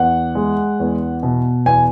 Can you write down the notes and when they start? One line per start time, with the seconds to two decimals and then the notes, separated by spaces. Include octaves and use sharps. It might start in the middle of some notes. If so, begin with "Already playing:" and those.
Already playing: E2 F#5
0.35 G#3
0.80 E2
1.23 B2
1.66 E2 G#5